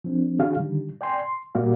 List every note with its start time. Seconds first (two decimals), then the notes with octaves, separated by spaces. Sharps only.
0.04 F3 C4 D4
0.39 D#3 C#4 D4 F#4 G#4 F5
0.57 D3 D#3 G3
1.01 D5 G5 G#5 C6
1.19 C6
1.55 A#2 G3 A#3 F#4 D5 F5